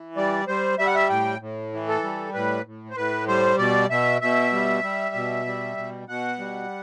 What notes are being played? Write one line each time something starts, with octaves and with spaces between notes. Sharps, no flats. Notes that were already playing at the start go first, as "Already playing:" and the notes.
Already playing: E3
G3 D5
G3 C5
G3 E5
F#5
E5
A2 G5
A2
E3
A4
G3
A2 B4
A2
C5
A2 B4
G3 C5
B2 D5
B2 E5
B2 E5
G3
G3
B2
G3
B2
B2 F#5
G3